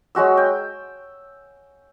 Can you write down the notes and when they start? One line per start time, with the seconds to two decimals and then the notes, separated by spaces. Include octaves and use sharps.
0.15 F#3 G#3 F#4 E6
0.37 G5